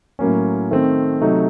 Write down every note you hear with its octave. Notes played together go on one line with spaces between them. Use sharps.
A2 F#3 A#3 C#4
D#3 A3 C4
C3 F#3 A3 D#4